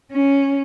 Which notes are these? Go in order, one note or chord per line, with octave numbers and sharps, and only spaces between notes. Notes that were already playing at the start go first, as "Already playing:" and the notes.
C#4